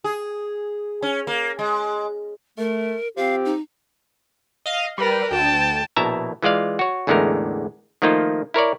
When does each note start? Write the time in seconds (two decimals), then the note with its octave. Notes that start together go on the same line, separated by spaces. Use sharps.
0.04 G#4
1.03 C#4
1.27 A#3
1.59 G#3
2.58 A3 A#4
3.17 F3 C4 G4 F5
3.45 D#4
4.66 D#5 F5
4.98 G3 A#4 B4
5.31 D2 G5 A5
5.96 A#1 B2 E4 E5 A5 A#5
6.42 E3 G#3 F4 D5 F5
6.79 F#4 C#5
7.07 A1 E2 D3 G#3 A3 A#4
8.02 D#3 F3 A3 A#3 D#4 F4
8.54 E4 A#4 C#5 D5